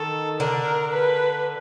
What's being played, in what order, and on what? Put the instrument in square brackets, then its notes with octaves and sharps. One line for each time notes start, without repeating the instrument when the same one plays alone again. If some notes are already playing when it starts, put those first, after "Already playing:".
Already playing: [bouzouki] D#3 D#4 [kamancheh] A4
[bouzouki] D3 D4 [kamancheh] A#4
[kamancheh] B4